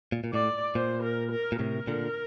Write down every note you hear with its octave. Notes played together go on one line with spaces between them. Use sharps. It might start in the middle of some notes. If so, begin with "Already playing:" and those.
A#2
A#2
A2 D5
A#2 C5
A#4
A#4
A#2
A2 C3 A#4
A#2 D3